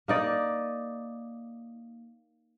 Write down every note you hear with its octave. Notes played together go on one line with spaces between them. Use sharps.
A#3 D#4 D5